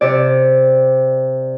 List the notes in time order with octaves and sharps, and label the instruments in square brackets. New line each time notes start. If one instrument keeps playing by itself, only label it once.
[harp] C3 D5